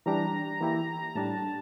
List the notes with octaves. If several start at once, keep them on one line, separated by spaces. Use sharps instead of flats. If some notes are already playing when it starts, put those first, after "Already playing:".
E3 G3 D4 G4 A#5
E3 A#3 E4 G4
A2 G3 D4 G4 A5